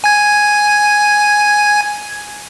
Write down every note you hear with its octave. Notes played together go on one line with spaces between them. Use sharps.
G#5 G#6